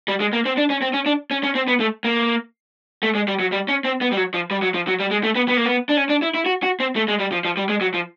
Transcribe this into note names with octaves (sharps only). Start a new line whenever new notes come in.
G3
G#3
A#3
C4
D4
C#4
C4
C#4
D4
C#4
C#4
C4
B3
A3
A#3
A3
G#3
G3
F#3
G3
C#4
C4
B3
G3
F#3
F3
G3
F#3
F3
F#3
G3
G#3
A3
B3
B3
A#3
B3
D4
C#4
D4
E4
E4
F#4
F#4
C4
A3
G#3
G3
F3
F3
G3
G#3
F#3
F3